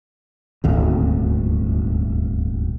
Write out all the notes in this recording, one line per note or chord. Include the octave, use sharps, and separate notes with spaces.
D#1 G#1 D2